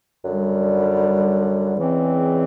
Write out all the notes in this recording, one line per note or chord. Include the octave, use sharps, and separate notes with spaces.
F#2 D3 G3
E2 C#3 E3 G#3 C4